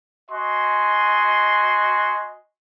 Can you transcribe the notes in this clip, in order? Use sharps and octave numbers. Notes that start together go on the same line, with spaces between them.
F#4 D#5 G#5 C6